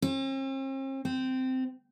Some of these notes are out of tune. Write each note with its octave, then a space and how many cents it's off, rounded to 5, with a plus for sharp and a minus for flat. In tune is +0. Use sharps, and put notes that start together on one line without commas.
C4 +45
C4 -15